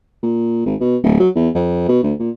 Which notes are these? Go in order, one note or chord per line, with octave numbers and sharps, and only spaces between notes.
A#2
G#1
B2
D1
F#3
E2
F2
B2
D2
A#2